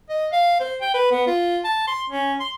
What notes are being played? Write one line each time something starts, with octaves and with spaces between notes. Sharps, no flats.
D#5
F5
C5
G5
B4
B3
F4
A5
C6
C#4
C6